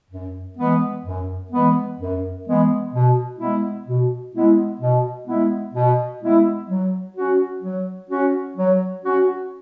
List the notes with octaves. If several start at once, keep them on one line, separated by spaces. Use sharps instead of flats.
F#2
E3 G#3 B3
F#2
E3 G#3 B3
F#2
E3 G#3 B3
B2
G#3 B3 E4
B2
G#3 B3 E4
B2
G#3 B3 E4
B2
G#3 B3 E4
F#3
C#4 F#4
F#3
C#4 F#4
F#3
C#4 F#4